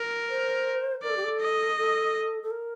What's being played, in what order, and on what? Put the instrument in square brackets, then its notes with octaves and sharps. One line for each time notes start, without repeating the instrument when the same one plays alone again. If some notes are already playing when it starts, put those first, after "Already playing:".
Already playing: [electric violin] A#4
[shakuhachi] C5
[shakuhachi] A#4 [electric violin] D5
[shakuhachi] A4
G4
A4
[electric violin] D#5
[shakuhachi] A4
A4
A#4